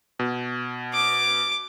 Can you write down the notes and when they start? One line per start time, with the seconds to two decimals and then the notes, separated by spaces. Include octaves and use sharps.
0.19 B2
0.94 D6